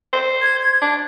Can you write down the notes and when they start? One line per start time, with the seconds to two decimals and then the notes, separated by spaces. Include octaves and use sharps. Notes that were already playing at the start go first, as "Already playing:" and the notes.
0.13 C5
0.42 G#6
0.60 G#6
0.82 D4